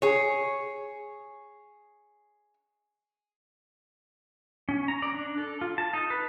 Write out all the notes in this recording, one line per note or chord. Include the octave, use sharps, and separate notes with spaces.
G#4 C#5
C#4
A#5
D5
D4
A4
F4
A5
D#4
B4